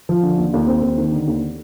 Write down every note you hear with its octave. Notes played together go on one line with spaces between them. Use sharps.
F3
D3
D#2
D#2
C4
D#2
D#3
D3
D#2